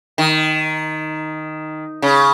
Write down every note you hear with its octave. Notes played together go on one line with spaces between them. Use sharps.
D#3
C#3